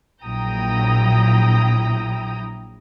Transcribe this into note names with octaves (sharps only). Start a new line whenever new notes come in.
A#1 F#3 E4 G5 A#5 D#6